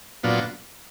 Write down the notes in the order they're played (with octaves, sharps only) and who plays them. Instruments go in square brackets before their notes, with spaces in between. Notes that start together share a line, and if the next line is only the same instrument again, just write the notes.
[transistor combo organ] A#2 F#3 B3 D4 F4